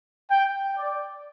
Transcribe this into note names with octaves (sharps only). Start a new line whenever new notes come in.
G5
D5